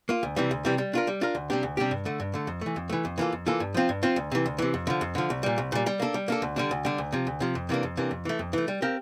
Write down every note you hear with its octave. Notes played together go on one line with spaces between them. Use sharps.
A#3 F4
D2
C3 E3 G3
D2
C3 E3 G3
G3
D4 F4 A#4
G3
D4 F4 A#4
D2
C3 G3 D4 G4
D2
C3 G3 D4 G4
G2
D3 A3
G2
D3 A3
F2
E3 A3
F2
E3 A3
F2
E3 A#3 F4 A4
F2
E3 A#3 F4 A4
G2
F3 C4 F4
G2
F3 C4 F4
D2
C3 E3
D2
C3 E3
F2
D3 F3
F2
D3 F3
C2
A#2 G3
C2
A#2 G3
G3
A#3 D4 A4
G3
A#3 D4 A4
D2
D3 G3 D4
D2
D3 G3 D4
D2
C3 F3
D2
C3 F3
F2
C3 E3 A#3 D4
F2
C3 E3 A#3 D4
F2
E3 A3
F2
E3 A3
G3
C4 G4 A#4 F5